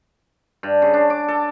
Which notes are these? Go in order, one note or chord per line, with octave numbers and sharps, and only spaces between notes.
G2
C#3
D4
D6
A4